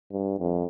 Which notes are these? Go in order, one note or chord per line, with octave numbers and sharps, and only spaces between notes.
G2
F2